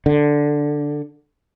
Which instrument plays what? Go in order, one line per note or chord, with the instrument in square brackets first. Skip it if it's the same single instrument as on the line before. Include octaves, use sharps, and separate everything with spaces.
[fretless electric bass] D3